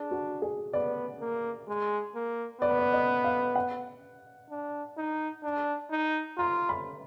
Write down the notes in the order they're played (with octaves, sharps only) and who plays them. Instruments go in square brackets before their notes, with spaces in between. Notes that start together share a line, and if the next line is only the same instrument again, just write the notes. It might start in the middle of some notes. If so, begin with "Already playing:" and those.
Already playing: [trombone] D4 [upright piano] G#4
[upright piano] F#4
G#4
[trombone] B3 [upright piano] D5
[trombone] A#3
G#3
A#3
[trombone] B3 [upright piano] D5
[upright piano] B4
D5
D#5
F5
F#5
[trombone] D4
D#4
D4
D#4
[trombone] F4 [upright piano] A#5
[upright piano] B5